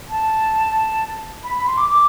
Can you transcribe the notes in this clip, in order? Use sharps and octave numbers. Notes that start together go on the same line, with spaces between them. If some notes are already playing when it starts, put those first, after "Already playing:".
A5
B5
B5
C6
D6
D6